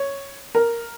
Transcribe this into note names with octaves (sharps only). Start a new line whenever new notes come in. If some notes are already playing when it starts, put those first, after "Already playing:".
Already playing: C#5
A#4